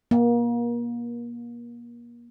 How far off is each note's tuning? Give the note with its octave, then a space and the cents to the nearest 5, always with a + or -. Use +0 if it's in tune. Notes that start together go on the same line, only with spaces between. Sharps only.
A#3 +30